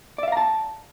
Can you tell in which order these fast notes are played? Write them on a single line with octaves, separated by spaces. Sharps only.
D5 E5 F5 A#5 A5